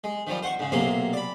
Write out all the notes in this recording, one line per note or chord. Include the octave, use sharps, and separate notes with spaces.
G#3
D#3 F3 G3
C5 F#5 C#6
G#2 C#3
B1 C3 F#3 A#3 G#4 C6
D5 B5